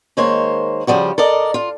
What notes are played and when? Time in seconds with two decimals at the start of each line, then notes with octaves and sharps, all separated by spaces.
0.17 D#3 G#3 A#3 C5 C#5
0.87 C#3 F3 G3 F#4
1.18 A4 A#4 D5 D#5
1.54 F4